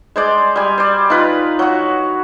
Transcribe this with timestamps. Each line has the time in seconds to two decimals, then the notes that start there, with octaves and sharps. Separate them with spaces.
0.16 G#3 C5 D5
0.56 G3 G#5
0.78 C5 D5
1.10 D#4 F4 B4
1.59 F#3 F#4